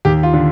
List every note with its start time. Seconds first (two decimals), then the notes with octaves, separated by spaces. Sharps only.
0.05 D#2 G4
0.23 F4
0.34 D3